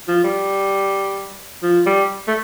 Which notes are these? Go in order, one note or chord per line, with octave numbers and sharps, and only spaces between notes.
F3
G3
F3
G3
A3